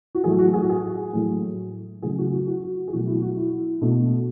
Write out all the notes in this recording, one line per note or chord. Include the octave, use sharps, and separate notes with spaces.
F#4
A2 F#3 A3 G#4
F#4
G#4
F#4
G#4
A2 F#3 A3
C#3 F#3 A3 G#4
F#4
F#4
F#4
G#4
B2 F#3 A3 F#4
E4
F#4
E4
B2 A3